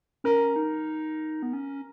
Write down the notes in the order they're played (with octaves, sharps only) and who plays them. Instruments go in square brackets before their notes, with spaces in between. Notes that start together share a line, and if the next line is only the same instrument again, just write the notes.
[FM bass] C#4 [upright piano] A#4
[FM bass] D#4
B3
C#4